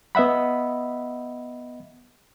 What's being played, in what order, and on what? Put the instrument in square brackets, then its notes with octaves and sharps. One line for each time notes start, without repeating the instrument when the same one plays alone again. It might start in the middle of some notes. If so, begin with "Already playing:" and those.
[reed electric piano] B3 D#5 E5 F#5 B5